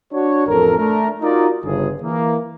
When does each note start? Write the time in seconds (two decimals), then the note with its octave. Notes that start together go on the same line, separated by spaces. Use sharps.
0.12 D4 F#4 C#5
0.47 A1 F2 A4 A#4
0.78 A3 D4 A#4
1.21 D#4 F4 F#4 A#4 D5 D#5
1.63 G1 C#3 G#4
2.02 E3 A#3